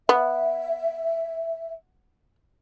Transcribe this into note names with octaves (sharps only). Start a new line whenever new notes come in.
B3 E5